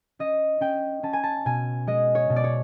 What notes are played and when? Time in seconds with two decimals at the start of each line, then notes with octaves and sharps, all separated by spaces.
0.19 C#4 D#5
0.61 C#4 G5
1.03 C#4 A5
1.13 G#5
1.23 A5
1.45 B2 G#5
1.87 G#3 D#5
2.15 C#5
2.30 B2
2.36 D5
2.44 C#5